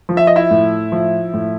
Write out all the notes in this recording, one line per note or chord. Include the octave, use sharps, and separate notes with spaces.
F3
E5
D#5
E4 E5
A2
F3
A2